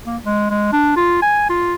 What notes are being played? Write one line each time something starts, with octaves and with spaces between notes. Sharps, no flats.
A#3
G#3
G#3
D4
F4
G#5
F4